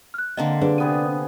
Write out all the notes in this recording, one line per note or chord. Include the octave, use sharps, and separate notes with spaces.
F6 F#6
D3 A#3 C4 D#5
D4 G#4 B4
C3 B3 G#4 D#7